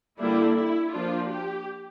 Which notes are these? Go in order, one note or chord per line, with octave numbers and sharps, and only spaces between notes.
D3 G3 A#3 D4 E4
E4
F3 A#3 D4 F4
G4